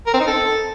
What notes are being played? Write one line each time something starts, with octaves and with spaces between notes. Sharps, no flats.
A#4
C4
D#4
A4